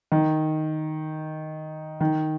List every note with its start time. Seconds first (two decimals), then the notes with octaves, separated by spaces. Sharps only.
0.12 D#3
2.01 D#3